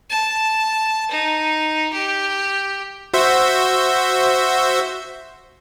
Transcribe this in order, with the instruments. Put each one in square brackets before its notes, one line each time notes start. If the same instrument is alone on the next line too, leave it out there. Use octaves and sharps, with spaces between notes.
[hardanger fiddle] A5
D#4
G4
[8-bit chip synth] F#4 C5 E5